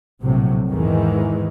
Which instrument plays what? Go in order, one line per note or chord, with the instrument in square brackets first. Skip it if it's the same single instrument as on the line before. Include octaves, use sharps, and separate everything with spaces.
[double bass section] A#1 A2 C3 F#3
E2 G#2 D#3 E3 G#3